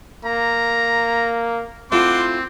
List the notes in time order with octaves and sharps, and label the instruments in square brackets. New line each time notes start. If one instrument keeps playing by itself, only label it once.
[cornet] A#3 [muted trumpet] A#5
[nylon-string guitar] A3 E4 F4 [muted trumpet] C4 [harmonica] F#5 C6 D6